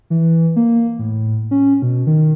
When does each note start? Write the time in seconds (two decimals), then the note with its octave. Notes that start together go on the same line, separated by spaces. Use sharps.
0.10 E3
0.56 A#3
0.99 A2
1.51 C#4
1.82 B2
2.07 D#3